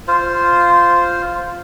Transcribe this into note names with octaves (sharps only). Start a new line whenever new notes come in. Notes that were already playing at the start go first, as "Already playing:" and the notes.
F4 C5